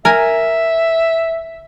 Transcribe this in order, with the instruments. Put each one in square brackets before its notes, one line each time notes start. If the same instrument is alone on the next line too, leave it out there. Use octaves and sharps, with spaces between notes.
[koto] A#4 G#5 [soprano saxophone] E5